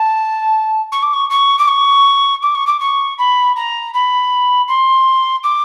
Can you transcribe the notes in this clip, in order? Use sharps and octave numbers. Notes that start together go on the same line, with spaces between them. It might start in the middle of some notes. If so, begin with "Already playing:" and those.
Already playing: A5
C#6
D6
C#6
C#6
D6
C#6
D6
C#6
D6
C#6
B5
A#5
B5
C6
D6